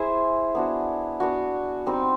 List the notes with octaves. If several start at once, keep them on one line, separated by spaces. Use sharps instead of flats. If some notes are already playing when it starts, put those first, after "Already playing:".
Already playing: E4 G#4 C5 E5
B3 D4 F#4
B3 D4 F#4
G3 C4 D#4 G4